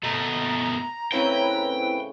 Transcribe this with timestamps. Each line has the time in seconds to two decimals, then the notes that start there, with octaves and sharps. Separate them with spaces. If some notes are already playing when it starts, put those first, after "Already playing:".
0.03 B2 A3 D#5 A#5
1.12 A2 C#3 C4 E4 B4 C#5 G5